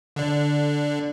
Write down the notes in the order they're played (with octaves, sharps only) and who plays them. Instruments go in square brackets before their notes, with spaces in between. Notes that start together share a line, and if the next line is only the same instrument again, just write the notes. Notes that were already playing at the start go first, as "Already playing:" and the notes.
[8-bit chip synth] D3 D4